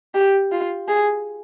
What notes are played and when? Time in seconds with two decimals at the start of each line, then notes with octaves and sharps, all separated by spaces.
0.14 G4
0.52 F4
0.88 G#4